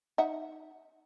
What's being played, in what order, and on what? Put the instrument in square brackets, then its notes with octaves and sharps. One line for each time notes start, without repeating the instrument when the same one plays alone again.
[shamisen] D#4 E5 F#5